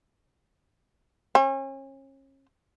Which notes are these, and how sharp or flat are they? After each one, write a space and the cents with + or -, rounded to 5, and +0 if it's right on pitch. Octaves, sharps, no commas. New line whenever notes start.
C#4 -35